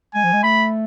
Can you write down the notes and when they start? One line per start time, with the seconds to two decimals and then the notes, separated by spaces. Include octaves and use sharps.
0.14 G#3 G#5
0.24 F3
0.33 G#3
0.43 A3 B5